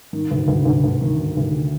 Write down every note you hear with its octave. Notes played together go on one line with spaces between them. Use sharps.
D#3
D2
D2
D2
D2
D#3
D#3
D2